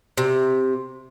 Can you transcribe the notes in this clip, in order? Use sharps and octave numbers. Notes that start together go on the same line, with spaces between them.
C3